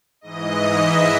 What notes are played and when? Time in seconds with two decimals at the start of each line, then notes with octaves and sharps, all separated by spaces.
0.21 G#2 E3 D#5
0.77 E5